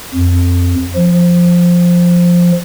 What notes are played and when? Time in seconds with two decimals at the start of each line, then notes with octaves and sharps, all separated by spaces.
0.14 F2
0.96 F3